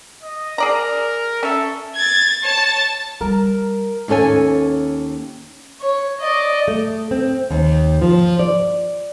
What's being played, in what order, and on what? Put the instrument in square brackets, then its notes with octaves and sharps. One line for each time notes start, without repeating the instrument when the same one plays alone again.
[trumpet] D#5
[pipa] G#4 D5 A#5 [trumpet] A#4
[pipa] C#4 E5 [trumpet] A4
[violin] G#6 A6
C#5 A5
[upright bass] G3 [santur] A#4
[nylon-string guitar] D#2 C#4 A4 C#5 G#5
[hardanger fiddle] C#5
D5 D#5
[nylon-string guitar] A3
C4
D#2
F3
D5